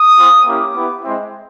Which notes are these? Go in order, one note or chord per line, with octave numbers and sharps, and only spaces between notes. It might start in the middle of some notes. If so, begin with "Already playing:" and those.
Already playing: D#6
C4 F4
A#3 C#4 E4 G4 D6
B3 E4 G4
G#3 C4 E4